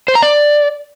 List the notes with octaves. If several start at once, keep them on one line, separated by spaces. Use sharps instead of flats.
C5
A#5
D5